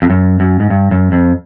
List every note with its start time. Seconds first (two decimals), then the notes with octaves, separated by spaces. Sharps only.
0.02 F2
0.10 F#2
0.40 F#2
0.60 G#2
0.70 G2
0.91 F#2
1.12 F2